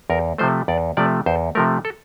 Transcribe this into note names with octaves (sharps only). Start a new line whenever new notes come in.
E2 A#4
C3 F3 A3 C5
E2 D5
C3 F3 A3 D5
E2 C5
C3 F3 A3 A#4
A4